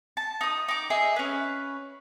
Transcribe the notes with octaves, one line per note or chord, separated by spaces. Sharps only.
A5
D#4 D#6
D#4 D6
G#4 D#5 E5
C#4 B4